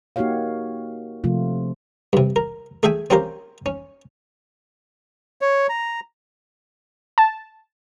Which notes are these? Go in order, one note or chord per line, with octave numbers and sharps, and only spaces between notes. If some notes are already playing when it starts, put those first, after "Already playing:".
A#3 D#4 F#4 G4 C#5 F5
C3 F3 A3 F4
G2 C3
A#4
A3 G#4 E5 G5 G#5
C4 C#4 F4 G4 A#4 C5
C#4
C#5
A#5
A5